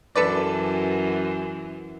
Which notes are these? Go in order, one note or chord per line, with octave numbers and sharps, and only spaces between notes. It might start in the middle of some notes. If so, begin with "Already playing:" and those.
F#2 E3 A4 B4 D5